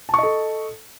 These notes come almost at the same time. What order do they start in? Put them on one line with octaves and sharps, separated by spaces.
A5 C#6 D#5 A4